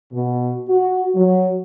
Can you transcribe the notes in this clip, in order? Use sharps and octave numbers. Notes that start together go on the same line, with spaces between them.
B2
F#4
F#3